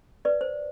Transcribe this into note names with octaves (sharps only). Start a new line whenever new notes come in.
B4 D5
C5